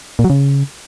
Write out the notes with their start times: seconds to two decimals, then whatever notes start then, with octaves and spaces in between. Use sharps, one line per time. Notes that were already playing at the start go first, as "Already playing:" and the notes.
0.19 A#2
0.24 F#3
0.30 C#3